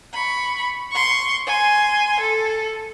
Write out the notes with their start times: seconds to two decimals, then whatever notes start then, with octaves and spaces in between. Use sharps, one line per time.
0.13 B5 C#6
0.91 C6 C#6
1.46 G#5 C6
2.20 A4